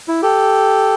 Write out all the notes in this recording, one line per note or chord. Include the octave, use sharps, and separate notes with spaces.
E4
G4 A4